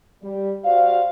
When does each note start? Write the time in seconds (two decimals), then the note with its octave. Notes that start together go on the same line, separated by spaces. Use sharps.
0.23 G3
0.64 F#4 G4 C5 D5 F5